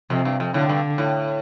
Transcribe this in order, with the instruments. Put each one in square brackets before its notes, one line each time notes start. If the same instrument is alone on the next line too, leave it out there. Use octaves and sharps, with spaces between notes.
[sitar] F2 [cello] C3
[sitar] G2
F2
[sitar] A2 [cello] D3
[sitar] G2
A2